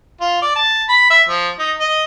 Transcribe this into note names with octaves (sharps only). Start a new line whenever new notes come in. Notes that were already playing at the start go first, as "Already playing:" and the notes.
F4
D5
A5
B5
E5
F3
D#4
D#5